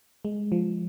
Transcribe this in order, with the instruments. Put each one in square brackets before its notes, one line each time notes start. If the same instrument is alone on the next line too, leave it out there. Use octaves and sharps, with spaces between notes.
[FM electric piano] G#3
F3